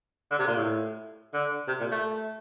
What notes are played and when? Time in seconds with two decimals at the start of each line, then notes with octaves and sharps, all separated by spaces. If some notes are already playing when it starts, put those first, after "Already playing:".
0.31 D3
0.39 C3
0.47 A#2
0.56 A2
1.34 D3
1.68 C3
1.80 A#2
1.91 A3